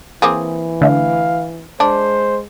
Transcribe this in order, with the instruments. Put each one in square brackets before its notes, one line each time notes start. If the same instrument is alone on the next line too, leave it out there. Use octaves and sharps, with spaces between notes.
[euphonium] E3 [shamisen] A#3 C4 G#4
[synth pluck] D3 A3 [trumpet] F5
[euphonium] G#3 [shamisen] D4 [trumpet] C5